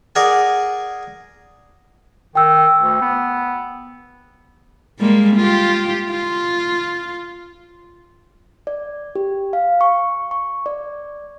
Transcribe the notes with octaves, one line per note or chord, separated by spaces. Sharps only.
G#4 A#4 D5 F#5 G#5
D#3 G5 E6
D2
B3
G3 G#3 A#3
F4 G4
F4
D5
G4
F5
C#6
C#6
D5